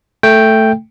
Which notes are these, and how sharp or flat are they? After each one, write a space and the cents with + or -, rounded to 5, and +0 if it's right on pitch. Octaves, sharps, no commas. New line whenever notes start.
A3 +0 G5 +0